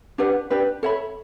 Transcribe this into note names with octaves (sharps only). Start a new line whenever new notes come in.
D4 G4 B4 F#5
D4 G4 B4
A4 C#5 E5 B5